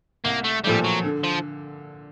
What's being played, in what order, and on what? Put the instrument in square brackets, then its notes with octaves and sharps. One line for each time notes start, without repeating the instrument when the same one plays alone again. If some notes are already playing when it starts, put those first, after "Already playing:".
[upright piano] C2 [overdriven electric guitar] A#3
[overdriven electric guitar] A3
[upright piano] A#2 F3 A3 [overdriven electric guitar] G3
[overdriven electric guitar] F#3
[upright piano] D3
[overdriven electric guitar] F3